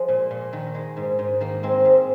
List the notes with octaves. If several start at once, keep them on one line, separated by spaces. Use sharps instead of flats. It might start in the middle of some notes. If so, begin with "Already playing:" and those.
Already playing: F3 G#3
A#2
A#2
D#3
G#3
G#2
G#2
D#3 A#3
G#3 C4
G#2